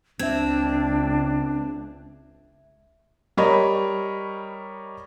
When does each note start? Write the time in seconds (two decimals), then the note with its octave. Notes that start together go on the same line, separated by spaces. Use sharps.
0.19 C#2 C4 D4 E5 G#6
3.37 G3 A#4 C#5 D#5 B5 C#6